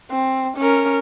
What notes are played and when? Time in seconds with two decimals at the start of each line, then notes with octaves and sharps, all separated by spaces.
0.10 C4
0.57 C#4 A#4